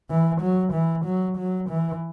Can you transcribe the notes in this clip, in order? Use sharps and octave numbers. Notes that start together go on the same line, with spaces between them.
E3
F#3
E3
F#3
F#3
E3